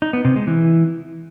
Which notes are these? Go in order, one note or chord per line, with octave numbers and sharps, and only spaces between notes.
D#4
B3
C3
G#3
E3